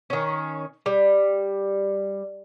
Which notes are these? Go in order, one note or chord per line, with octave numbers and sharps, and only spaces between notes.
D#3 C#4
G3